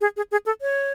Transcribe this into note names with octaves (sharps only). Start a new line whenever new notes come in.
G#4
G#4
G#4
A4
C#5